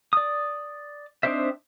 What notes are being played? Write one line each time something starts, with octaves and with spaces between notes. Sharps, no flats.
D5 D#6
C4 D4 D#4 C5 E5